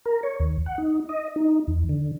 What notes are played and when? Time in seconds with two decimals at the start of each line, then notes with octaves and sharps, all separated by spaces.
0.06 A#4
0.23 C#5
0.40 D#2
0.66 F#5
0.78 D#4
1.09 D#5
1.36 D#4
1.67 E2
1.89 D3